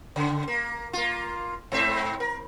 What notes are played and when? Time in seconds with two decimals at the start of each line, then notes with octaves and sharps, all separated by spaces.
0.16 C#3
0.48 A#3
0.93 A#3 F4
1.72 G#2 C4 E5
2.20 A#4